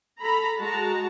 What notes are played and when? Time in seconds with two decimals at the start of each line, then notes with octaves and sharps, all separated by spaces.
0.21 A4 A#5 B5
0.60 G#3 F#4 A5 A#5